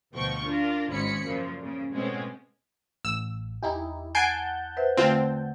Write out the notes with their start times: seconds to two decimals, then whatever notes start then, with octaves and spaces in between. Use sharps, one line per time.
0.13 D2 B2 F3 G5 C#6
0.45 D4 F4 A#4
0.90 G#1 C#3 G#3 C#4 B5 C#7
1.24 F#2 A#2 C#3 F3
1.61 A#2 C#3
1.93 B2 G#3 A3 C4 C#4
3.05 A1 E6
3.63 E2 D#4 E4 G4 A#5
4.15 F#5 G#5 A5 G6 C7 D7
4.77 B4 C5 E5
4.97 D3 A3 C4 F4